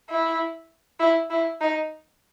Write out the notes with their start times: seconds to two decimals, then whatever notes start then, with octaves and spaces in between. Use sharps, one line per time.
0.10 E4
1.00 E4
1.30 E4
1.60 D#4